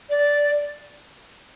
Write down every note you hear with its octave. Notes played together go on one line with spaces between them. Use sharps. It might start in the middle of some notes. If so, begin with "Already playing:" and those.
D5